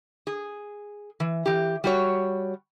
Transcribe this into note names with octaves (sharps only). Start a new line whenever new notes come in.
G#4
E3
E3 G4
G3 F#4 C#5